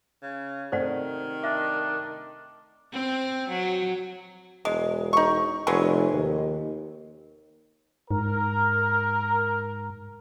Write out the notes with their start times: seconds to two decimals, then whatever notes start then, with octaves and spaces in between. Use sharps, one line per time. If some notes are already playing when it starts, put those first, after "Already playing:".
0.22 C#3
0.72 C3 D#3 A3 A#4 C5 D5 F#5
1.44 D4 E5
2.93 C4
3.49 F#3
4.65 E1 G#3
5.13 D#4 C#6
5.67 F1 F#3 G#3 B3
6.13 D#2
8.11 G#2 A#4